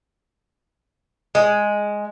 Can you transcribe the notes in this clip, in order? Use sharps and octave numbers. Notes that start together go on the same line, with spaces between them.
G#3